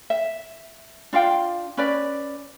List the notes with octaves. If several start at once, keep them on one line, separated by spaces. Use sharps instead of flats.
E5
D4 F4 F5 G5
C#4 B4 D5